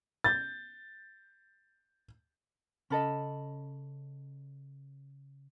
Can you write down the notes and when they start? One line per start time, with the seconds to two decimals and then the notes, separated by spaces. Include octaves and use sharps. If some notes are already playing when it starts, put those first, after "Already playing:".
0.24 G6 A6
2.90 C#3 C#4 A4 D#5 B5